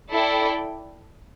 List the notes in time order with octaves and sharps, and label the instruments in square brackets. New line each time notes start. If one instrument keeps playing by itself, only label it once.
[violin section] E4 A4 D5 G5